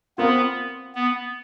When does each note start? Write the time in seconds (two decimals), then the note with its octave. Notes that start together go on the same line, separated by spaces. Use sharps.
0.18 B3 C4 F4 A#4
0.95 B3